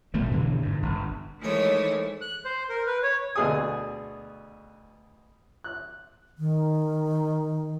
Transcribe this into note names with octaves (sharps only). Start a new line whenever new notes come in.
A#1 B2 G3 A3
G2 B2 D3 E3
G1 G#2
G1
D#3 E3 G#3 A3 C5 C#5
F#6
C5
A#4
B4
C#5
D2 B2 G#4 A4 G#5 D#6
F#6
D#3